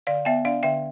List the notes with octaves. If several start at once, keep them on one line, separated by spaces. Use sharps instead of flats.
D3 D5 F5
B3 E5 G5
D4 D5 F5
D3 E5 G5